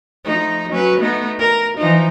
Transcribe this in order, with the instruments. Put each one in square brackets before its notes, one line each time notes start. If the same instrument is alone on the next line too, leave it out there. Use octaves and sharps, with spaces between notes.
[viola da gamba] F3 A3 D#4
F#3 C#4 B4
A3 B3 D#4
A#4
E3 F3 D#4